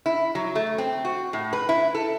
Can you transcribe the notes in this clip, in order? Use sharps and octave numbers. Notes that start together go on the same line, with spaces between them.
E4
F#3
A3
C4
F#4
A2
B4
E4
A4